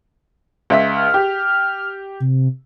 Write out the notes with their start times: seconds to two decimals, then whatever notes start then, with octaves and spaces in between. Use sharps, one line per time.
0.70 C#2 E5 B6
0.96 F6
1.14 G4
2.20 C3